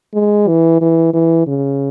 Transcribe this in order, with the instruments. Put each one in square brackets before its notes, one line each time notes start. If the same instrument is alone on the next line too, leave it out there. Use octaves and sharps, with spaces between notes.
[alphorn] G#3
E3
E3
E3
C#3